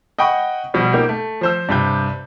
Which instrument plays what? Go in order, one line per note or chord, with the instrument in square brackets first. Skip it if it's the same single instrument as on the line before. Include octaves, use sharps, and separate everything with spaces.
[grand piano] D#5 F#5 G5 B5 C#6
B2 F3 G3
A#3 D#4 G4
A3
F3 C5 E6
G2 C3 G6